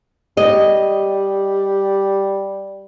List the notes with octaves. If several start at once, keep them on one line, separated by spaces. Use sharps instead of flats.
G3 D#5